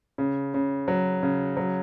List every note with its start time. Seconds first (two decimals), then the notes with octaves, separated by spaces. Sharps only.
0.18 C#3
0.54 C#3
0.88 F#3
1.23 C#3
1.57 F#3